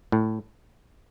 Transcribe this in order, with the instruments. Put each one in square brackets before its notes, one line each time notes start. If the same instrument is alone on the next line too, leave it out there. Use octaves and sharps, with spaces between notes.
[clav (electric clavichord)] A2